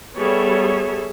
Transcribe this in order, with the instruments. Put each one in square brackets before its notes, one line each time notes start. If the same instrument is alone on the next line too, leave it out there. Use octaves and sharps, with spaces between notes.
[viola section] G3 B3 C#5 [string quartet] G#4 A4 E5